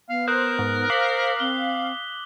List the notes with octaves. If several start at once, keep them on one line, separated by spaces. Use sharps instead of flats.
B3 F5
A#4 C5 D#6 F#6
G#2
C5 F5 D6 B6 F#7
C4 G7